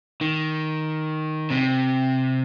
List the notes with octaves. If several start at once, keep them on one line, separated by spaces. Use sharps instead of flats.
D#3
C3